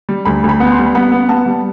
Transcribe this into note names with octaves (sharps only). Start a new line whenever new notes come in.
G3
D2 B5
D2
B5
B3
C6
G3
B3 B5
B3
B3 A5
G3